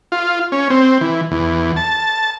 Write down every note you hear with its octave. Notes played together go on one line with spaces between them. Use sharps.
F4
C#4
C4
E3
E2
A5